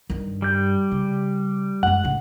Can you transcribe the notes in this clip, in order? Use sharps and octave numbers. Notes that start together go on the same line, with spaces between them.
G2 D#3
G3 G6
C#3
F#2 G#3 F#5
A2 C#3